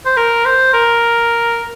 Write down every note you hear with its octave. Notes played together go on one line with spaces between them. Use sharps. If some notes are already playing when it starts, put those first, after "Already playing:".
C5
A#4
C5
A#4